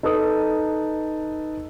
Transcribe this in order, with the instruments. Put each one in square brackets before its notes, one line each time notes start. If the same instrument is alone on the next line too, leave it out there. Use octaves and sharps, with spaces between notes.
[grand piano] D#4 A4 B4 D#6